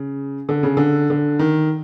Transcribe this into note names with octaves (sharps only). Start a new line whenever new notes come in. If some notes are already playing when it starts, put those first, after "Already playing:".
Already playing: C#3
D3
C#3
D3
D3
D#3